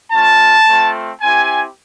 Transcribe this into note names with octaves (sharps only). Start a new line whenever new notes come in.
A3 C#4 F4 A5
A3 C4 F4
C4 E4 G4 G#5